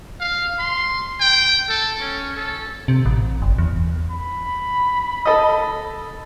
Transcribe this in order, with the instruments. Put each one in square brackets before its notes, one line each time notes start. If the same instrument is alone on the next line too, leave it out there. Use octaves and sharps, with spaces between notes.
[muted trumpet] F5
C6
G5
A4
C#4
A4
[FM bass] C3
A1
F#1
E2
[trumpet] B5
[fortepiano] A4 D#5